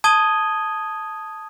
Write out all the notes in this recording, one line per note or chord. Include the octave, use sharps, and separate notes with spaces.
A5 D#6 G#6 D#7 G7